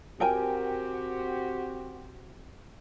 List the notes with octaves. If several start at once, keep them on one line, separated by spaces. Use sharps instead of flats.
C4 F#4 G4 A#4 G5 G#5